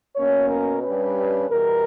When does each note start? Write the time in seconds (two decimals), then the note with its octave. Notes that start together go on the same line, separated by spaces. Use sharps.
0.15 B2 A#3 C#4 C#5
0.49 A#4
0.82 G2 G3 C#4 B4
1.49 E2 B2 G3 A#4